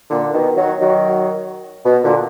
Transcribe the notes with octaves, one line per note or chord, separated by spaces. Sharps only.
A#2 D3
B2 D#3
D#3 F#3
D#3 F#3
B2
A#2 D3